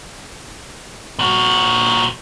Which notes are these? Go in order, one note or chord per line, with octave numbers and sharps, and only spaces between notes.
A#2 F#4